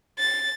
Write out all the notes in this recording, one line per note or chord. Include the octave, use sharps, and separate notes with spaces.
A6